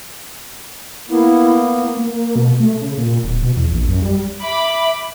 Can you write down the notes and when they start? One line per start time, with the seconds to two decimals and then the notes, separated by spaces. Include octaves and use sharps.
1.10 A#3 B3 E4
1.97 A#3
2.36 B2
2.60 A3
2.81 C#3
2.97 A#2
3.24 D1
3.43 B2
3.56 E2
3.71 A#1
3.87 F#2
4.02 G3
4.43 E5 B5 D6